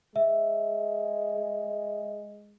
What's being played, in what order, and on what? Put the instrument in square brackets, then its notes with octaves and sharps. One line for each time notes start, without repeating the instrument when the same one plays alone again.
[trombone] G#3 [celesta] E5